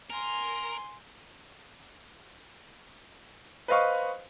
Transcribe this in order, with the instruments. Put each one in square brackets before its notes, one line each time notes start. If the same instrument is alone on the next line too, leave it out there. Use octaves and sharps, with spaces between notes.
[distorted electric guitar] A#4 [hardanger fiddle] G#5 C6
[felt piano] B4 C5 D#5 F5 C#6